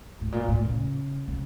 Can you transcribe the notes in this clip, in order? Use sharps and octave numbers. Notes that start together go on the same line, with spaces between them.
A2
A#2
A2
C#3
C#3